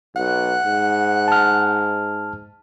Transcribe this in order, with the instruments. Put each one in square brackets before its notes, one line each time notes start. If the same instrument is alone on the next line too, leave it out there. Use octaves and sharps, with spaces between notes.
[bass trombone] B1 [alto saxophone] F#5
[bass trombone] G#2
[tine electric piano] A5 F6